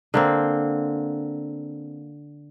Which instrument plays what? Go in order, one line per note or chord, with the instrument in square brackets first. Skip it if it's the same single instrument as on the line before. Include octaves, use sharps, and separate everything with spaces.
[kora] D3 A#3 C4